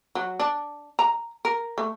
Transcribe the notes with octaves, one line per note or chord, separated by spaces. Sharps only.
F#3
D4
A#5
A#4
A3